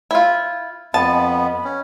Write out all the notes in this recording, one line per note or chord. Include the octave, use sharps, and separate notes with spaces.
E4 F4
F2 B3 D#5 A5 B5
C#4